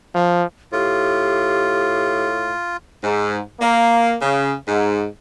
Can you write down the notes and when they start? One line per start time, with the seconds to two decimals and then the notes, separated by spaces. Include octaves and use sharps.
0.15 F3
0.73 A2 F4 G4
3.03 G#2
3.60 A#3
4.21 C#3
4.68 G#2